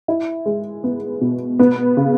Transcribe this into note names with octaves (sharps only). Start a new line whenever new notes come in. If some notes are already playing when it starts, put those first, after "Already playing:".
E4
G#3
B3
B2
B3
C#3